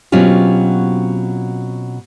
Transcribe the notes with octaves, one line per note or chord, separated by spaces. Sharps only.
B2 F#3 C4 C#4 F4 G4